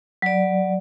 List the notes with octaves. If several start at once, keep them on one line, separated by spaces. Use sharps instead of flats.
F#3 D5